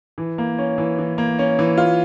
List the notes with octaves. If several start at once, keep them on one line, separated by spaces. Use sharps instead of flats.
E3
A#3
C#4
E3
E3
A#3
C#4
E3
F4